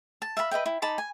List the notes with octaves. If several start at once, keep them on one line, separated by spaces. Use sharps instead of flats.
A5
E5 F5 A5 B5
B4 D#5 E5 G5
E4
D#4 A5 B5 D6
G#5